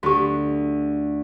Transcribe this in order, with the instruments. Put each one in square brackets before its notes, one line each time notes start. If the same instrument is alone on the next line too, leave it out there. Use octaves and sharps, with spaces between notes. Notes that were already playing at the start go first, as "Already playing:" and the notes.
[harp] D2 [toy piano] F#4 G4